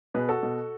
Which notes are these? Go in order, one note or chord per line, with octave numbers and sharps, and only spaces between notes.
B2 G#4 B4
F#4 A4
B2